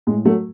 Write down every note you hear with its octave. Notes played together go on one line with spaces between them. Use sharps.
A2 G#3
F#3 A3